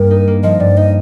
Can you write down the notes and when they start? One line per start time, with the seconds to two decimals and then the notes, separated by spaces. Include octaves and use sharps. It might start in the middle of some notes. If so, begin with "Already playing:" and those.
Already playing: G2 G3 A#3 A#4
0.11 D#4
0.27 A#3
0.43 F3 D#5
0.60 G2 D5
0.77 D#4 D#5